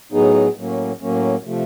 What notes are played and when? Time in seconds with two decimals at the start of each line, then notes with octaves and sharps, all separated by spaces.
0.12 A2 F#3 B3 D#4 G#4
0.56 A2 F#3 A#3 C#4
1.00 A2 F#3 A#3 C#4
1.44 C3 F3 A3